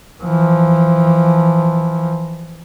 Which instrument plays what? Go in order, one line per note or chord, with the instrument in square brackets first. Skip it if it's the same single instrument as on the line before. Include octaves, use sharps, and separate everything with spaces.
[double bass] E3 F3